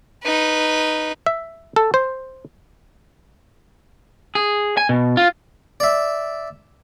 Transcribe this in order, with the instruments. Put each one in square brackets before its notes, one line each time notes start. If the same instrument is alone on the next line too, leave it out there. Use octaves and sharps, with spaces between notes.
[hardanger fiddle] D#4 B4
[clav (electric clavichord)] E5
A4
C5
[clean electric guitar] G#4
G#5
B2
F4
[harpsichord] D5 E5